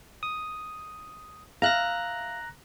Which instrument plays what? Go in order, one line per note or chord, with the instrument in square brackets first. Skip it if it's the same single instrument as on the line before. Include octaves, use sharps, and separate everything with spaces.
[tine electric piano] D#6
[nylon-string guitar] E5 F5 [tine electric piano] A#5 F#6 A#6